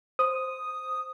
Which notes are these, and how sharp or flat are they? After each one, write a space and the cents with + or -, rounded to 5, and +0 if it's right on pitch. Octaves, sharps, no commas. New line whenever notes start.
C5 +0 D#6 +0